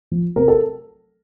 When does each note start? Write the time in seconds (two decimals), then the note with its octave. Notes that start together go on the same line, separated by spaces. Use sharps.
0.11 F3
0.36 C3 A#4
0.48 A4